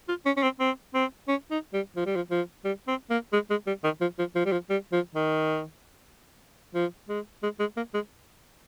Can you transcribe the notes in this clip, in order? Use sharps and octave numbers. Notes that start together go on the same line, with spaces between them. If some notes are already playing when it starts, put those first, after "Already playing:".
F4
C#4
C#4
C4
C4
C4
C#4
D#4
G3
F3
G3
F3
F3
G3
C4
A#3
G#3
G#3
G3
D#3
F3
F3
F3
G3
F3
G3
F3
D#3
F3
G#3
G#3
G#3
A#3
G#3